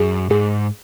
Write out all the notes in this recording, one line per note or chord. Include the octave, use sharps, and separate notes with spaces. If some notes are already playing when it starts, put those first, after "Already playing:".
Already playing: F#2 G#4
G#2 G#4